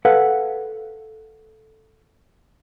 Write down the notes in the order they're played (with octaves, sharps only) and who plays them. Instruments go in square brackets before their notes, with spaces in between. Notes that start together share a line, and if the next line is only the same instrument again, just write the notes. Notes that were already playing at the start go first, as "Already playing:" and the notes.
[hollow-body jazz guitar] A4 B4 F5 F#5